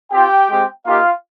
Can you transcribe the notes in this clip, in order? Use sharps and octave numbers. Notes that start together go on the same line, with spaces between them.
C4 F4 G4 G5
G#3 C4 G4
A#3 D#4 F4 G4 F5